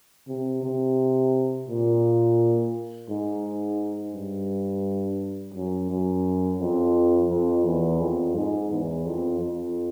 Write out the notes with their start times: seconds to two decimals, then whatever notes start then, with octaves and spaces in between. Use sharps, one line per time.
0.28 C3
0.63 C3
1.68 A#2
3.09 G#2
4.15 G2
5.54 F#2
5.90 F#2
6.59 F2
7.29 F2
7.65 E2
8.00 F2
8.35 G#2
8.71 E2
9.06 F2
9.41 F2